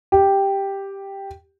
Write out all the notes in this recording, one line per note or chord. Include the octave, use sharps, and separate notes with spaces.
G4